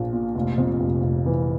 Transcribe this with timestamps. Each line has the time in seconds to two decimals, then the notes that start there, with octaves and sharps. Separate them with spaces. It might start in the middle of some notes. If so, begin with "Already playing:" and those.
Already playing: A#1 A#2 F3
0.13 A#2
0.35 F1
0.58 F2
0.80 F1
1.03 F1
1.26 E3